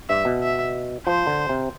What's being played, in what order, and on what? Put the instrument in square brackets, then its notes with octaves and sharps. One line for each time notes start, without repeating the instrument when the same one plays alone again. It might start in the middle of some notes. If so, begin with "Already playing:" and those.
[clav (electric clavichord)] G2 [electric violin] E5
[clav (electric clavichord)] B2
[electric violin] E5
[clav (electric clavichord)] F3 [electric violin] C5
[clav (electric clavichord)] D3
C3